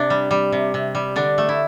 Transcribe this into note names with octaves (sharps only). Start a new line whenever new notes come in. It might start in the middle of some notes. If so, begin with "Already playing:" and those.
Already playing: C3 D4
G3
G3
C3
C3
G3
D3 D4
A3
E4